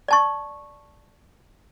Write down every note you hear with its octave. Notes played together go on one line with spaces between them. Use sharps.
D5 A5 C#6